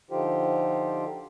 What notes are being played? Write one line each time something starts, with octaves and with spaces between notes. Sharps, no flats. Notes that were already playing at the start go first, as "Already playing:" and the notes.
D3 F3 D#4 F4 G4 C5